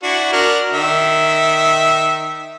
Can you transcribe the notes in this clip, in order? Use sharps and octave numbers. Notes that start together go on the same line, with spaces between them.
D4 E4 F#4
D4 F#4 A#4
D#3 E5